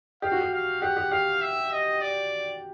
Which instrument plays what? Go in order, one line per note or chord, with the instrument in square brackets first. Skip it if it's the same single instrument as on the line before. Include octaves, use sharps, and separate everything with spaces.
[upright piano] G4 [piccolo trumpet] F5
[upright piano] F#4
G4
[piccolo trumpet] F5
[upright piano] G4 [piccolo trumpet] F#5
[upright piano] G4
[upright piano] G4 [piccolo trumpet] F5
[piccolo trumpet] E5
D#5
D5